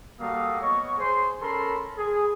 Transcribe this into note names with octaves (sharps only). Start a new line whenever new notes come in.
G3 A#3 F#4 A4 F5 D#6
B3 C#5 D#5 C#6
G#4 C5 C6
C#4 A4 A#4 B5 C6
G#4